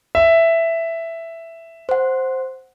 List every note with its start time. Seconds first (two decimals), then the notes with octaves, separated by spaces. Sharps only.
0.15 E5
1.89 C5 F#5